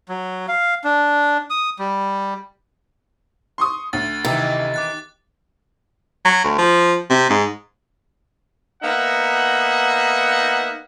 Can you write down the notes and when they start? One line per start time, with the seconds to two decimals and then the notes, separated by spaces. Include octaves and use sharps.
0.09 F#3
0.48 F5
0.84 D4
1.50 D#6
1.79 G3
3.58 C6 C#6 D#6
3.93 D2 A6
4.25 C3 D#3 E3 D#4
4.74 D6 F#6 A6
6.25 F#3
6.44 D2
6.58 F3
7.10 C3
7.30 G#2
8.83 A#3 B3 D#4 E5 F#5